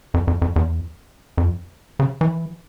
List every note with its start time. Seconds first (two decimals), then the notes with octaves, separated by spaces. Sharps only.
0.14 F2
0.27 F2
0.42 F2
0.56 E2
1.38 F2
1.99 C#3
2.21 E3